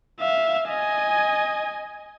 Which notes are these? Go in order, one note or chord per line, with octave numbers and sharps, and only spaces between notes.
E5 F5
D#5 G#5